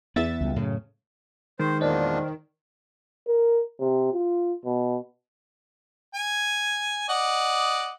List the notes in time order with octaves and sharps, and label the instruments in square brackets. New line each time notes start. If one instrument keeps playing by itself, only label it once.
[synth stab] E2 E5 A6 [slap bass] B3
[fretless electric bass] C#2 G3
[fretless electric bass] F#2 C#3 [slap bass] A2
[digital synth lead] D#3 [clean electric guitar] G#3 D#4 [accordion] C5
[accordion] E2 A#2 D4 [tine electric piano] C5 D5 D#5
[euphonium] A#4
C3
F4
B2
[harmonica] G#5
D5 D#5 F#5